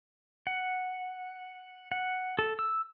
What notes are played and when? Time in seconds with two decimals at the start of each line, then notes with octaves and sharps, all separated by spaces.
0.47 F#5
1.92 F#5
2.39 A4
2.59 E6